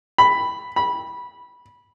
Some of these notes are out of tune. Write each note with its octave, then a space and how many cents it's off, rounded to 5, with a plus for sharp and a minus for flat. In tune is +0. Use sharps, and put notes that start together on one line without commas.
B5 +5
B5 -15